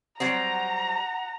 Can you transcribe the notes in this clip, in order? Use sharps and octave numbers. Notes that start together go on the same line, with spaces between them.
F#3 G3 C4 F#5 A#5